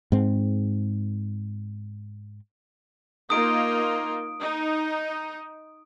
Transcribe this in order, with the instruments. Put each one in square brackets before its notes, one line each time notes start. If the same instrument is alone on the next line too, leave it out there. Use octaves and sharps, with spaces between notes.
[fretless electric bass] G#2 C4
[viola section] A#3 D#4 F4 [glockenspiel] D#6 D7
[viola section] D#4